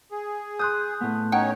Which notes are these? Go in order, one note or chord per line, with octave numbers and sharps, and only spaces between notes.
G#4
C6 D#6 F#6 G6
A2 B3
C#4 D#4 C#5 F#5 G5